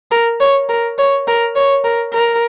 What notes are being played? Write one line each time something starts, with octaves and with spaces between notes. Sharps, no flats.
A#4
C#5
A#4
C#5
A#4
C#5
A#4
A#4